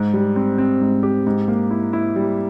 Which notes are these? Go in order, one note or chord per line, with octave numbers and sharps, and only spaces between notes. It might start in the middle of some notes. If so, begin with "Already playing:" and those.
Already playing: G#2
G3
C4
C4
G#2
G4
G#2
A#3
E4
E4
G3